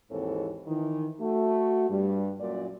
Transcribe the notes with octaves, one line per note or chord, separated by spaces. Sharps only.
D#2 G#2 E3 C4 A4 C#5
D#3 E3
A3 F#4
G2 G3
F#2 A#2 D5